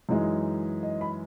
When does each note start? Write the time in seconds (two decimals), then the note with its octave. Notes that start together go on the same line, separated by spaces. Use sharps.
0.09 F#2 E3 G#3 D#4
0.83 D#5
1.01 B5